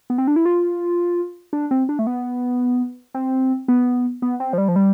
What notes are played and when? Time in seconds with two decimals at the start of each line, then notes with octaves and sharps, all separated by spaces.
0.10 B3
0.18 C4
0.27 D4
0.36 E4
0.46 F4
1.53 D4
1.71 C4
1.89 D4
1.99 A3
2.07 B3
3.14 C4
3.68 B3
4.22 B3
4.40 C4
4.53 F3
4.58 G3
4.68 F3
4.76 G3